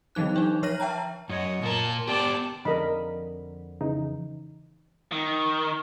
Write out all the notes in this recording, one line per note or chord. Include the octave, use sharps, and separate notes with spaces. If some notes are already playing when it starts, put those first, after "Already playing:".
D3 E3 F#3 D#4 F#6
D4 D#4
F3 C#5 F6 A#6 D#7 F#7
E5 G5 A5 A#5
F#2 C#5 D#5
A#2 A#4 A5
B3 G4 D5 A5
F2 D3 A#4 D#5 B5
C#3 E3 D#4
D#3